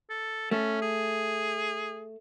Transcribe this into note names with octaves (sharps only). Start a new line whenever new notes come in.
A4
A3 C#4
G#4